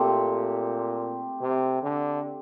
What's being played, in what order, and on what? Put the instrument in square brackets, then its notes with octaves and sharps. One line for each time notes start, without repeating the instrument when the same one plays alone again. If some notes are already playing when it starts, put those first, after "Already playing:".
Already playing: [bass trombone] A#2 [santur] A3 C4 G4
[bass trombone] C3
D3